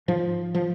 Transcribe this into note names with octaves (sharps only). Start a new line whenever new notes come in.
G#2 F3
F3